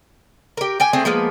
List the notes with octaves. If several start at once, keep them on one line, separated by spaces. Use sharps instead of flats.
G4 A#4
G4 G5 G#5
A3 C4 G#4
F3 G#3 A#3 B3